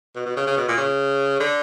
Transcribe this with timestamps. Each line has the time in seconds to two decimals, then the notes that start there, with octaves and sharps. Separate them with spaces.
0.16 B2
0.26 B2
0.37 C#3
0.47 C#3
0.57 B2
0.68 A#2
0.77 C#3
1.40 D3